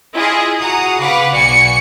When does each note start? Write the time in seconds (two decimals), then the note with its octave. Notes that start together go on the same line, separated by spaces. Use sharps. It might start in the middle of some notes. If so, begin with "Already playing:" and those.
0.14 E4 F4 G#4 D#5
0.61 F#4 G#4 F#5 A#5 D#6
1.01 C#3 B4 F5 F#5 D6
1.32 B1 F#4 D5 G#5 C#7